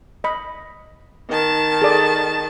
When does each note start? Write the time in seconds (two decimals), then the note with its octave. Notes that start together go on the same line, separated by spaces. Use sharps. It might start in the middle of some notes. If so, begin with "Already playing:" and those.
0.24 D#5 B5
1.30 D#3 A5
1.82 G#4 A4 D5